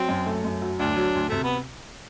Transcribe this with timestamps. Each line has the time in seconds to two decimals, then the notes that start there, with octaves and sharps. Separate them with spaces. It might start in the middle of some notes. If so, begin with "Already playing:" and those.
Already playing: F#3 C4
0.09 F#2
0.26 A3
0.45 F#2
0.62 F#3
0.80 D2 D4
0.97 F#3
1.15 D2
1.29 C3 A3
1.44 B3